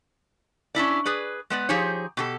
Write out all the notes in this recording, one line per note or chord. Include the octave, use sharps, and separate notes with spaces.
C#4 D4 E4 D5
G#4 B4 D5
G#3 B3 D5
F3 D#4 G4 G#4 C5 C#5
B2 G4 A4